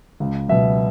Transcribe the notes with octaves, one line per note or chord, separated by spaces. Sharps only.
C#2
B2 F#3 E5